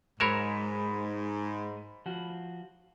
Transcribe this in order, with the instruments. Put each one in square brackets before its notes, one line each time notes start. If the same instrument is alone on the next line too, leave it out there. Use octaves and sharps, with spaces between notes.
[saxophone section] G#2 [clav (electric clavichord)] F#3 A#4 C#5 [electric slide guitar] G#3 [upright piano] B5 E7
[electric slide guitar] F3 F#4